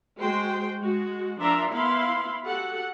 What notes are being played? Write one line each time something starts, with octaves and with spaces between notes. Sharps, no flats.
G#3 F#4 C5 G5
G#3 F#4
F3 D4 A#4 E5 A#5 C6
B3 E4 F5 B5 C6
F#4 G4 A4 F#5